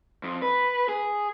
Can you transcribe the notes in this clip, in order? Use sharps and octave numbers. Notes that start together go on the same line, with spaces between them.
F2
B4
G#4